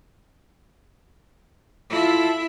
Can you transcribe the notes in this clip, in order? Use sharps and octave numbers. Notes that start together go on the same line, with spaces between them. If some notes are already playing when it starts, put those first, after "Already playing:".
E4 F4 A4 E5